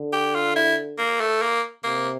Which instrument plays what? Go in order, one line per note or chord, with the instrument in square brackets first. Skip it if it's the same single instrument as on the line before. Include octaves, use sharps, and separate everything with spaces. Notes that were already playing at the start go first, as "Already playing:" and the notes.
Already playing: [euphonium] D3
[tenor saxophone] G4
F4
E4
A#3
A3
A#3
[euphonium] C3 [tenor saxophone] A#3